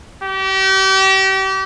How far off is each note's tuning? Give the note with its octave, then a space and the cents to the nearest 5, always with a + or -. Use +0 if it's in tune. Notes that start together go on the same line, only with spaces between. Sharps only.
G4 -35